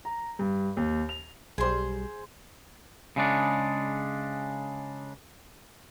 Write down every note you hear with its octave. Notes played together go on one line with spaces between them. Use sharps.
A#5
G2
D#2
F7
B1 G3 G#4 C5
C#3 G#3 D4